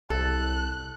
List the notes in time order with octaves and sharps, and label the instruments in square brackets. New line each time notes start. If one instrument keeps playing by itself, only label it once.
[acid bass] C2 [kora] A4 [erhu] F#6